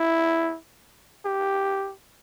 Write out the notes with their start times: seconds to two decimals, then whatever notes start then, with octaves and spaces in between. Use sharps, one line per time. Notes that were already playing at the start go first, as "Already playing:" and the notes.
Already playing: E4
1.25 G4